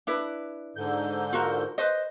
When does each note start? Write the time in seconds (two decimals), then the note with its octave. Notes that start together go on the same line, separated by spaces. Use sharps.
0.07 D4 E4 B4
0.76 G#2 D3 G6
1.33 F4 F#4 A#4
1.78 B4 C5 D#5